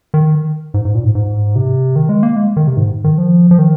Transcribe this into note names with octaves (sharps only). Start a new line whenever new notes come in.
D#3
G#2
G#2
A#2
G#2
G#2
C3
D#3
G#3
A#3
G#3
D#3
C3
G#2
D#3
F3
F3
D#3